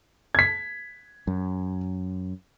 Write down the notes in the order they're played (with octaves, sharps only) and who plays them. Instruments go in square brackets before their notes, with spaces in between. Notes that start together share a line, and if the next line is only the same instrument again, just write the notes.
[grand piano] G#6 B6
[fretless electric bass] F#2